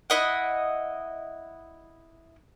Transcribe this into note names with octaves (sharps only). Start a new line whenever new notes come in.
E4 D#5 F#5